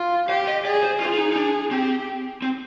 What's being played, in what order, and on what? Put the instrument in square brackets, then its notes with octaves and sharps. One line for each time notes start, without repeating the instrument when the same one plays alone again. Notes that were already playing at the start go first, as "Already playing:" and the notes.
Already playing: [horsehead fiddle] F4
[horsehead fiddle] G4 [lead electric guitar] F5
[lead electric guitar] D#5
[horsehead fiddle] G#4 [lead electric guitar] D5
[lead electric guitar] C5
[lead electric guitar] F4 [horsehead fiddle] G#4
[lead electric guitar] F4
D#4
D#4
D4
[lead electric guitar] C4 [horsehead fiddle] G4
[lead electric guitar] C4